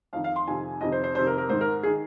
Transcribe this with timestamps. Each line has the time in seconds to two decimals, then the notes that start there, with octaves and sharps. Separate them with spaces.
0.13 F2 F5
0.16 D#3
0.24 F5
0.36 C6
0.47 F2 C3 D#3 G#5
0.81 F2 C3 D#3 D#5
0.92 C5
1.04 C5
1.15 F2 C3 D#3 C5
1.27 A#4
1.38 A#4
1.49 G#2 D#3 C5
1.61 A#4
1.83 G#4
1.87 D#3